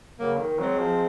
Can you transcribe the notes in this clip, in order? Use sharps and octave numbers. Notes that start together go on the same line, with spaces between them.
C#3 F#3 A#3
D#3
F#3 G#3 C4
F3